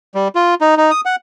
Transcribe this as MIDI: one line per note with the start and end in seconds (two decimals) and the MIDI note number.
0.15 0.28 55
0.35 0.55 65
0.61 0.75 63
0.77 0.91 63
0.91 1.01 87
1.06 1.16 78